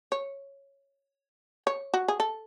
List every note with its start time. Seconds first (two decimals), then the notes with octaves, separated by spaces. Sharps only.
0.12 C#5
1.67 C#5
1.94 F#4
2.08 G#4
2.20 A4